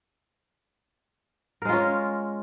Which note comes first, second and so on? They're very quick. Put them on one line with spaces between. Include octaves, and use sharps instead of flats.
A#4 G#3 F4 C#4